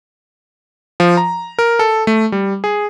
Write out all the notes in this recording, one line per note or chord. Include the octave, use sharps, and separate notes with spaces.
F3
A#5
A#4
A4
A3
G3
G#4